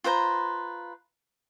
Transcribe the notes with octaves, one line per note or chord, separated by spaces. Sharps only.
F4 B4 C5 A#5